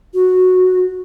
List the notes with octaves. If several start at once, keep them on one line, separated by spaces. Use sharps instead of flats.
F#4